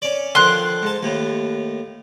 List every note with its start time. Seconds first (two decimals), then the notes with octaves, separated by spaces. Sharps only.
0.02 C#4 D5
0.35 D3 D#3 F3 C6 F#6
0.82 G#2 A5
1.03 D#2 A2